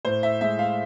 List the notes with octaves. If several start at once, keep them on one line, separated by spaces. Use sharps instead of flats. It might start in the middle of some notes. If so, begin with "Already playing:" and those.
A2 C5
E5
G#3 E5
F5